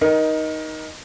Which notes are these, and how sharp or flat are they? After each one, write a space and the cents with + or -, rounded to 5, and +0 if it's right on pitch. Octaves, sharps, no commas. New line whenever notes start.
D#4 +5 A#4 +25